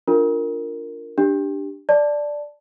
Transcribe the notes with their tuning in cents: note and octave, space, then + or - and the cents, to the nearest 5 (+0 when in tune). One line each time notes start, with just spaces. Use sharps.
D4 +0 F4 +0 A#4 -15
D4 +0 G4 +0
D5 +0 A5 +0